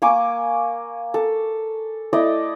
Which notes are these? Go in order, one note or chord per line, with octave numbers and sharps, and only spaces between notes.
A#3 G#5 C#6 D6
A4
A3 E4 D5 D#5